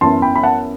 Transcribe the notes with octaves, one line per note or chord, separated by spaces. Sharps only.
F#2 E3 B3 A5 C6
G5 B5
B5
F#5 A5